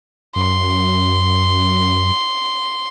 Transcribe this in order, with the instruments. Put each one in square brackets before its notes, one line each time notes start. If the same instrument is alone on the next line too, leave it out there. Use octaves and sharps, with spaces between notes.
[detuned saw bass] F#2 [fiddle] C6